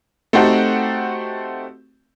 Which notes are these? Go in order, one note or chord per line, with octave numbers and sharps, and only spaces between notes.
A3 C4 D#4 F#4 G4 A4